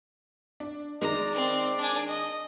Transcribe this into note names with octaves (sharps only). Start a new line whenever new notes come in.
D4
D#3 G#3 D5 A#5
C4
D4 G#5
D#5